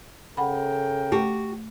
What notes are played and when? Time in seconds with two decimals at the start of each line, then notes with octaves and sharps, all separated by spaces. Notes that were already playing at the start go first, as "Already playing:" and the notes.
0.37 C#3 A4 A#4 F#5 G5 B5
1.12 A3 F#4 G4